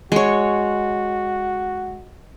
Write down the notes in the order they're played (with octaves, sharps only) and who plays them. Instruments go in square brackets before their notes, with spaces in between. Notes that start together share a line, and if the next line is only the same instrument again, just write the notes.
[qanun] G#3 C#5 [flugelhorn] F#4